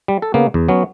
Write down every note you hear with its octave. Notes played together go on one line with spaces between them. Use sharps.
G3
A4
C#3 A#3 B3
E2
F#3 B3 C#4